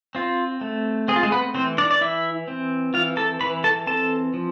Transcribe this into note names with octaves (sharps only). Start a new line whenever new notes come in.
C4 F4
A3
C4 G#4
F4
G#3 G#4
B3 B4
E3 C4 C5
D4 D5
D5
E3 E4 E5
C4
E3 F4 F5
A4 A5
E3 B4 B5
A4 A5
C4 A4 A5
F3